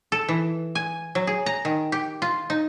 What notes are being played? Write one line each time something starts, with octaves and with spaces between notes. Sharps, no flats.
A4
E3
G#5
F#3
G#4
A#5
D#3
G4
F4
D#4